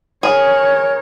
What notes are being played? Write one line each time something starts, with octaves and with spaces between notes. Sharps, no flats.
G#4 A#4 C#5